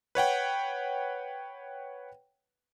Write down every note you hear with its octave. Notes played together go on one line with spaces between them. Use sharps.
B4 C#5 F#5 G5